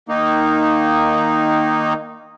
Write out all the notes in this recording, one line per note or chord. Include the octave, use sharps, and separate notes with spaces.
D#3 A#3 D#4